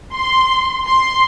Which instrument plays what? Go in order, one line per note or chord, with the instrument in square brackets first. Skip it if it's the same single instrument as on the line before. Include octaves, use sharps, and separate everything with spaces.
[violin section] C6
C6